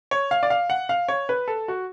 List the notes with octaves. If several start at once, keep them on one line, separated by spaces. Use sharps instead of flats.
C#5
F5
D5
F5
F#5
F5
C#5
B4
A4
F#4